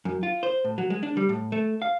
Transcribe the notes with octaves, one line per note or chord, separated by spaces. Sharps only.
F#2
F4
C5
A2
F#3
G#3
D4
G3
A2
A3
F5